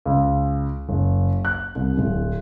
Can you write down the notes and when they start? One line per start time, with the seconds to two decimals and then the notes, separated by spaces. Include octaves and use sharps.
0.05 C#2
0.89 F#1
1.45 F#6
1.75 C2
1.97 D1